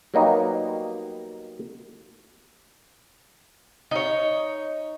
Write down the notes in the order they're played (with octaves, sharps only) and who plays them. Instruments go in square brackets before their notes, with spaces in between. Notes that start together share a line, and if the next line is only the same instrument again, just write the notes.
[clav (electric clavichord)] F#3 G3 A#3 B3 D#4
[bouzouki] D#4 C#5